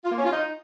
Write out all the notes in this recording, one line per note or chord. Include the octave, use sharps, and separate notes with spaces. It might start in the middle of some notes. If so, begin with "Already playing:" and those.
F4
A#3
C#4
F4
D#4